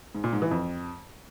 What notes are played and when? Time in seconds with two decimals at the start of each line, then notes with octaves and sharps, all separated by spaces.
0.15 G#2
0.24 A#2
0.33 G#2
0.42 E3
0.51 F2